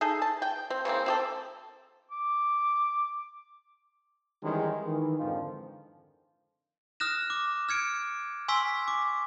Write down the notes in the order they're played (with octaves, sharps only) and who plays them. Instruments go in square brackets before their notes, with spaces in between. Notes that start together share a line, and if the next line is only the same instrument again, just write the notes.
[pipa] D#4 G#4 A4
A5
G5
C4
C#3 E3 A#3 C4
C4 G4 A4
[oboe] D6
[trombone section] D#3 E3 G3 G#3 C#4 D#4
D#3 E3
F2 G#2 D3 D#3 F3
[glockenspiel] D#6 F6 F#6 A#6 E7
D6
F6 G#6 C#7 D7
G#5 C6 C#6 E6 B6
D6